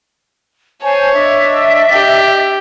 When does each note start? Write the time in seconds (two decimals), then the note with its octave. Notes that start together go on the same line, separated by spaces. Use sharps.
0.82 C5 C#5 G#5 A5
1.13 D4 D#5 E5
1.92 G4